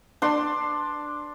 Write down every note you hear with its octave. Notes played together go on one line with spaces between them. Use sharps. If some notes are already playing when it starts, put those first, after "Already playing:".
D4 C6